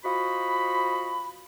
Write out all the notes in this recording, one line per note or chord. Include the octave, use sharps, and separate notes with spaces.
F4 F#4 C5 D#5 B5